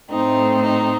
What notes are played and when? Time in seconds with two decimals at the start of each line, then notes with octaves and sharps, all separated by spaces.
0.11 A2 A3 C4 D#4
0.62 D#4